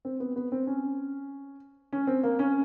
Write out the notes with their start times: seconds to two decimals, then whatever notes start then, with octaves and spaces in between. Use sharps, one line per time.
0.05 C4
0.20 B3
0.36 B3
0.52 C4
0.67 C#4
1.93 C#4
2.07 C4
2.23 A#3
2.39 C#4